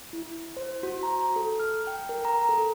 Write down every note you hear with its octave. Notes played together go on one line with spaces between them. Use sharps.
E4
C5
F#4
A#5
A4
F6
G5
A#4
A#5
A4